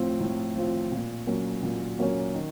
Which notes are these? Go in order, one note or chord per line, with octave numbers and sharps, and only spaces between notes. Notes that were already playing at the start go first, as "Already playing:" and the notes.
Already playing: A2 F3 C4 F4
A2
F3 C4 F4
A#2
F#3 A#3 C#4
A#2
F#3 A#3 C#4
D#3